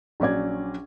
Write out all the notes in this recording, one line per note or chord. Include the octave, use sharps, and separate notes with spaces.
A#1 F#3 C#4 D5 G#6